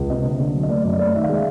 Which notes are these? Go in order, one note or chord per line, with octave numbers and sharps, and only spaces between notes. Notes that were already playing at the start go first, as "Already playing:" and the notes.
Already playing: C#2
C3 D#5
D3
D3
F#3
D#5
A3 D5
F#2 D5
D#5
A3 D5
D#3 E5
F5
G#3 E5